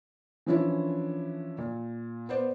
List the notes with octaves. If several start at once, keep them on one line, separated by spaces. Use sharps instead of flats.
E3 F3 C#4 D4 E4
A#2
B3 C5 D5